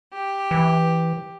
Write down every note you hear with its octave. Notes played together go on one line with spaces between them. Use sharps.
G4
E3